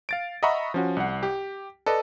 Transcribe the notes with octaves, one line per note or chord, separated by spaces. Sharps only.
F5 A6 D7
D#5 E5 F#5 A#5 B5 C#6
F3 C#4 F#4
C2 F#5
G4
A4 B4 D5 D#5